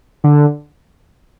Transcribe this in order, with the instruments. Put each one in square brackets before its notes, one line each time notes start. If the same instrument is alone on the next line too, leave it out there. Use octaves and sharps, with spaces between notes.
[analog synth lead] D3